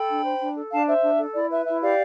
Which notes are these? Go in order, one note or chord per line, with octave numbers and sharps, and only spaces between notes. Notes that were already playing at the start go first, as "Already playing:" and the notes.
Already playing: A4 G5 B5
D4
C5
D4
A4
D4 F5 A5
C5 E5
D4
A4
E4 D5
B4 E5
E4 E5
G4 D5 F5